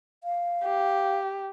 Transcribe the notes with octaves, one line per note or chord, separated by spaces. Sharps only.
F5
G4